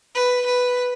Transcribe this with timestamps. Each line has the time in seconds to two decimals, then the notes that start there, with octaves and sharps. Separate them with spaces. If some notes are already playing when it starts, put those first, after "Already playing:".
0.15 B4
0.46 B4